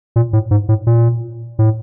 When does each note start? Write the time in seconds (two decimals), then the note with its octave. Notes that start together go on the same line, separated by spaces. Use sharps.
0.16 A#2
0.33 A2
0.51 G#2
0.69 A2
0.87 A#2
1.59 A2